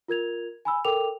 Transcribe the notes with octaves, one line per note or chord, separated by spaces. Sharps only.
F4 A#4 G#6 F7
G#5 B5 E6
A4 A#4 G5 D6 F7